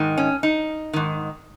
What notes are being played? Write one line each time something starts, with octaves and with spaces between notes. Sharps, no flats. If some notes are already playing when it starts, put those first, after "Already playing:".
Already playing: G#2 D#3
C#4
D#4
G#2 D#3